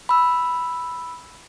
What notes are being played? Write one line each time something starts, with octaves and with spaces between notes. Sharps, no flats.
B5 E6